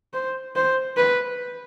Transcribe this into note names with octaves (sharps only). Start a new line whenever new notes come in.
C5
C5
B4